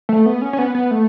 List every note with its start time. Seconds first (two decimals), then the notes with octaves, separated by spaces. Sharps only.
0.09 A3
0.26 B3
0.42 C#4
0.53 C#4
0.59 B3
0.75 B3
0.91 A3